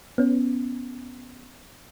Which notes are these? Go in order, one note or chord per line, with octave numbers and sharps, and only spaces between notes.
B3 C#4